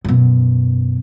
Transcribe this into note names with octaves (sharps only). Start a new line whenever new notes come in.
F#2 B2